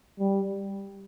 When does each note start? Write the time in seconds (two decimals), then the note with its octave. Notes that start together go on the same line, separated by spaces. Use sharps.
0.19 G3